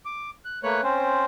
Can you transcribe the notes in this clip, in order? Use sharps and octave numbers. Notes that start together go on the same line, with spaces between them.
D6
F#6
A3 A#3 B4 C#5 F#6
C4 C#4 C5